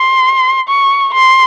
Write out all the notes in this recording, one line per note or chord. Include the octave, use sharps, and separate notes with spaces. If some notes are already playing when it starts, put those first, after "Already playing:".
Already playing: C6
C#6
C6